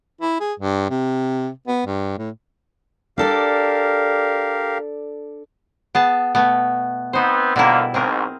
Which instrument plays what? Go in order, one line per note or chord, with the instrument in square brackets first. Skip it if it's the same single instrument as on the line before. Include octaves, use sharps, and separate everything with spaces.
[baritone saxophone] E4
G#4
G2
C3
B3
G2
A2
[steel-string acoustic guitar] D4 A4 D5 [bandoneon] G4 A#4 F5
[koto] B3 G#4 A5
B2 A3 B3
[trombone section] B3 C4 [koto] D#4 C5
[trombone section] F2 D3 A#3 [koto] B2 G3 E4
[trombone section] B1 G#2 [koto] C4 G#4 A#4